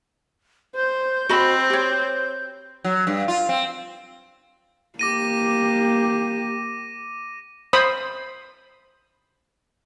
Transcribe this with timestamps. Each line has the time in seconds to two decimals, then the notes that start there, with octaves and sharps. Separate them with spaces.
0.76 C5 G6
1.29 C4 F#4 C5 D#5 B5
1.70 G4 C#5
2.85 F#3
3.07 G2
3.28 F4
3.49 C4
4.99 A#3 G4 D6 A#6 D#7
7.73 C5 B5 D#6